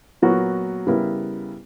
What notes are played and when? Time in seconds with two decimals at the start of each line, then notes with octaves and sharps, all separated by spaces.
0.22 A#2 F#3 B3 F#4 A#4
0.87 C#3 G3 B3 E4 A#4